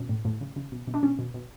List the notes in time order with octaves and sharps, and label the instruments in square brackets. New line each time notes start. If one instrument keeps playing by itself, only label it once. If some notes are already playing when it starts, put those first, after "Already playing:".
Already playing: [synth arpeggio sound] B2 C#4
A2
A2
C#3
C#3
B2
B2
D4
B2 C#4
B2
B2